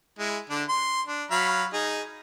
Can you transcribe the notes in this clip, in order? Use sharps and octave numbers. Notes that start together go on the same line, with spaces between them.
G#3 E4
D3 D4
C6
D4
F#3 F5 B5
D#4 G#4